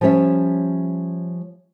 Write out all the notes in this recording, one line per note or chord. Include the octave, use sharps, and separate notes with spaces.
F3 G3 C#4 C#5 E5